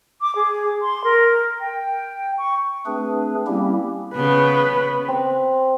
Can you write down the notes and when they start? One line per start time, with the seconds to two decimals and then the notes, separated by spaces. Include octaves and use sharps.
0.21 D6
0.36 G#4
0.82 C6
1.04 A#4
1.61 G5
2.38 C#6
2.86 A3 C4 D4 G#4 B4
3.47 G3 A#3 C4 C#4 E4 G4
4.15 C#3 B3 B4
5.08 C4